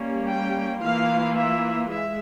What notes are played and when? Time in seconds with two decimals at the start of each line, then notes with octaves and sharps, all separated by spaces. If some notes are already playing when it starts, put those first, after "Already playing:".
Already playing: G3 A#3 C#4
0.29 G5
0.83 E3 A#3 F4 F5
1.37 E5
1.91 G#3 E5